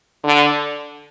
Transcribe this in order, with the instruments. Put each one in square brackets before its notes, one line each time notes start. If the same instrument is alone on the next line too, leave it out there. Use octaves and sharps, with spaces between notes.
[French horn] D3